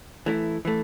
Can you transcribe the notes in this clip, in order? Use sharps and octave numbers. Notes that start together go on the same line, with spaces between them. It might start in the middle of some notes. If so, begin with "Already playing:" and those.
E3 A3 E4
E3 A3